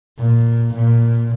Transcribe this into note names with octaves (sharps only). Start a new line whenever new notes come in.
A#2
A#2